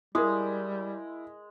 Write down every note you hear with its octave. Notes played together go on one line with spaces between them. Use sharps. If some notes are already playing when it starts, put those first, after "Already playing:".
G3 G#3 E4 A#4 D#6